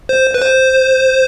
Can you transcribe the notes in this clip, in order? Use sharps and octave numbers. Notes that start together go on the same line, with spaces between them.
C5
B4
C5